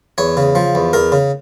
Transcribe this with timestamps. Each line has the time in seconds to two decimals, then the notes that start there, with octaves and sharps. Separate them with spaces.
0.18 E2 C#5
0.37 C#3
0.55 F3
0.75 E2
0.93 E2 A#4
1.12 C#3